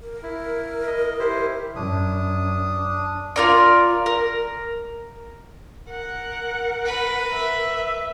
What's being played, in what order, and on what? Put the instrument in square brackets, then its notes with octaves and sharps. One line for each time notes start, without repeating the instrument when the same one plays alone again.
[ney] A#4
[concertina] E4
D#5
E4 G4 C5
[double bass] F#2 [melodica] D4 D#6
[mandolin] F4 A#4 D5
A#4
[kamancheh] A#4 [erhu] F#5
[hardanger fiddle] B4
[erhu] E5